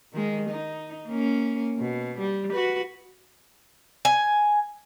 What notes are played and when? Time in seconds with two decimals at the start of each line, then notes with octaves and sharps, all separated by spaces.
0.13 D#3 G#3
0.50 D#4
1.08 A#3 C#4
1.78 B2
2.19 G3
2.53 F#4 B4
4.05 G#5